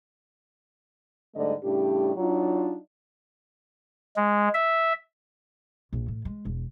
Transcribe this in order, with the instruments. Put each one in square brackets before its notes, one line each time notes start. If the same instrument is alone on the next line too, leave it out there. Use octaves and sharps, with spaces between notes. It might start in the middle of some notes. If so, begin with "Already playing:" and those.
[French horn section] G#2 D3 G3 A3 D5 D#5
A2 C#3 G3 D4 G4
F#3 D4 D#4 F4
[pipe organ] G#3
E5
[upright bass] A#1
A2
G#3
E1